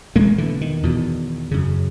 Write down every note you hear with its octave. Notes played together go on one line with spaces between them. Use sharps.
E2 B2 G#3 A#3
D3 E3
D#3
E2 B2
F#2 C#3